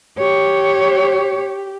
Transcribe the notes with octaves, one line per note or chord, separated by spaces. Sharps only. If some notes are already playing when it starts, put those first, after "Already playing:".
G4 C#5